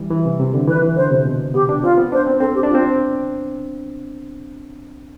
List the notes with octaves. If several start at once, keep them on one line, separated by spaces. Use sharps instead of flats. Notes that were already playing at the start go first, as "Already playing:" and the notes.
Already playing: E3 G3
E3
C3
C3
D3
E3 B4
E3
D3 C5
C3
B2
B3 G4
D4
C4 F4
B3
D4 C5
C4
C4 A4
G4
D4
F4
C4